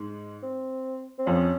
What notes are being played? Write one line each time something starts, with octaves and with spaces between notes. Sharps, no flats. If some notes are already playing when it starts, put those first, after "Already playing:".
Already playing: G#2 G#3
C4
C4
F2 F3 C#4